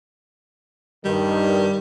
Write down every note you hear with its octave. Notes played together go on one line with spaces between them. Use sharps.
G2 D#3 G3